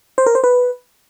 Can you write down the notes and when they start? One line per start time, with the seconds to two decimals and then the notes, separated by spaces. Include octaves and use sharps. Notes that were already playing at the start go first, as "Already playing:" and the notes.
0.18 C5
0.26 A#4
0.35 C5
0.44 B4